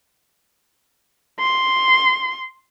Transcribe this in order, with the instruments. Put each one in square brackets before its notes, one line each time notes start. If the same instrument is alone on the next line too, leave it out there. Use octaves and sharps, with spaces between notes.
[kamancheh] C6